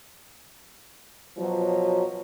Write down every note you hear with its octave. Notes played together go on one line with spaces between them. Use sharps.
B2 F3 F#3